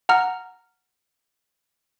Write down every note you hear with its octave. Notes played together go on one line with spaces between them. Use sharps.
F#5 A#5 F6